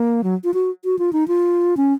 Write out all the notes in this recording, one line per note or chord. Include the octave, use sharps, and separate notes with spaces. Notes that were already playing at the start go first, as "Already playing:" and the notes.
Already playing: A#3
F#3
F4
F#4
F#4
F4
D#4
F4
C#4